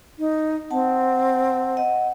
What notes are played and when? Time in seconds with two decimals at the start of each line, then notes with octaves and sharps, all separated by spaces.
0.19 D#4
0.71 C4 F#5 A5
1.77 D#5 F#5